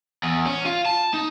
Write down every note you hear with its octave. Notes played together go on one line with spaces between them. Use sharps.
E2
C#4
F4
A5
D#4